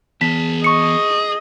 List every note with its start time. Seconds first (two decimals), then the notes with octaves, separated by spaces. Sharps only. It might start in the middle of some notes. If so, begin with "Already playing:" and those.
0.21 E2 G#4 A5 B6
0.64 D#5 C#6 C#7